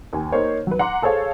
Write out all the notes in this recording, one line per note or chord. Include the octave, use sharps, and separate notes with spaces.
D#2 G#5
A#3 D#4 C5 C#5
F#3 B4
F#5 A#5 C6 D6
G#4 A4 C5 C#5 F5 A5